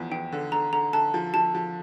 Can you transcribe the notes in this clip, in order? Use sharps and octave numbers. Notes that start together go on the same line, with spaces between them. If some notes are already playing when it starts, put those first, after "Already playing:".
Already playing: F1 E2 F3
E2 G5
D3
D3 A#5
D3 A#5
D3 A5
F3
F3 A5
F3